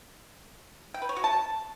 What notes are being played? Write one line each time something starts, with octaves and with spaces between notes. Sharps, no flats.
G5
B4
C#5
F#4
A5